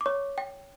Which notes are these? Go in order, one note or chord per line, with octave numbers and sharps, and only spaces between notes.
D6
C#5 C#6
G5